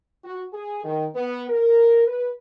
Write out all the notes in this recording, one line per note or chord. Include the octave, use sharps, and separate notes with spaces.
F#4
G#4
D#3
B3
A#4
B4